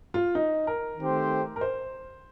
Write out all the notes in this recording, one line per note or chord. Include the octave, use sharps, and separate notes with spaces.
F4
D#4
A#4
D#3 A3 C4 G4 C5
A#4
C5